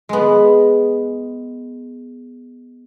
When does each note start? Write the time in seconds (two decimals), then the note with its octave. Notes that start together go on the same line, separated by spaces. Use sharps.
0.09 G#3 B3